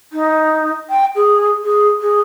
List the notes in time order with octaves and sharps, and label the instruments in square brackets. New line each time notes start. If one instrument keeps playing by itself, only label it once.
[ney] D#4
G5
G#4
G#4
G#4